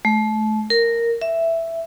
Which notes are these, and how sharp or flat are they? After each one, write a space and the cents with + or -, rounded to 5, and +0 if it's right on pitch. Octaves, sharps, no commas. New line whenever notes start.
A3 -30
A#4 -5
E5 +5